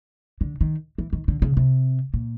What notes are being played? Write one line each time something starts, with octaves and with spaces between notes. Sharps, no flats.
D3
D#3
E3
D#3
D3
C#3
C3
A#2